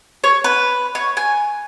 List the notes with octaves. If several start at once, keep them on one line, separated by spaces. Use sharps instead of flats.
C#5
B4
C#5
G#5